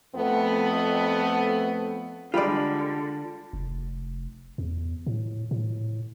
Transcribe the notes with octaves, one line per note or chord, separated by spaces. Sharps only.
F2 A3 B3
D3 G3 G#3 F4 D5 B5
F1
E2
A2
A2